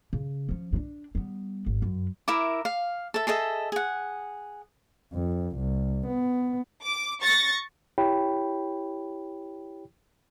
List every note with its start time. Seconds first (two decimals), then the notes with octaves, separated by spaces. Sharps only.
0.13 C#3
0.49 F3 C#4
0.73 G2 D4
1.15 G3 B3
1.66 G#1
1.82 F#2
2.28 E4 A#4 E5 D6
2.65 F5
3.14 A4 E5
3.27 G#4 A4 D#5 E5
3.72 G#4 F#5
5.14 F2
5.57 C2
6.07 B3
6.83 D6
7.22 C#6 A6 A#6
7.98 E4 G4 C#5 G5 B5